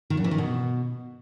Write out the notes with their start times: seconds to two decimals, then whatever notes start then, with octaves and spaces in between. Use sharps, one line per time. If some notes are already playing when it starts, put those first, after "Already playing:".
0.10 D#3
0.17 F#2
0.24 E3
0.31 D#3
0.38 B2